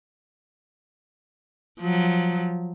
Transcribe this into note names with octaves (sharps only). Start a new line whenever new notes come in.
F3 F#3